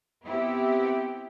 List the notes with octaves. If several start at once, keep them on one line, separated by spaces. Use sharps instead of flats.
B3 C4 E4 G4